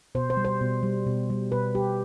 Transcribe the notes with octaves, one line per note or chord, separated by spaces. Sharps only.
B2 C5
C5
G3
C5
B2
G3
B2
G3
B2 B4
G3 G4